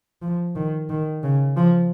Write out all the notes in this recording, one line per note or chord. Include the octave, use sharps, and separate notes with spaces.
F3
D#3
D#3
C#3
F3